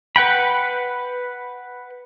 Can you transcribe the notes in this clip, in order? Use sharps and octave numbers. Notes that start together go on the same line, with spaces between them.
B4 F#5 G5 B5